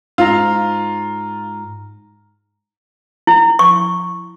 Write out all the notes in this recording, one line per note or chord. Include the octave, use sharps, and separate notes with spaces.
G#2 F4 A#5
E4
C#6